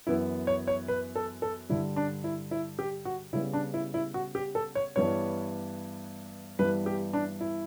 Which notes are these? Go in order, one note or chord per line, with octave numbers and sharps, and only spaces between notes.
F#2 E3 B3 E4
C#5
C#5
B4
A4
A4
G2 D3 G3 E4
D4
E4
E4
G4
F#4
C#3 G3 B3 E4
D4
E4
E4
F#4
G4
A4
C#5
G2 E3 G3 B3 C#5
G2 E3 G3 B3 B4
G4
D4
E4